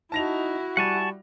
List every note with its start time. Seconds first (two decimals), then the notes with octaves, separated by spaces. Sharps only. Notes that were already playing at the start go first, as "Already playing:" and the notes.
0.12 D#4 E4 F#4 A5 A#6 F7
0.77 G3 F#5 G#5 A5 C#6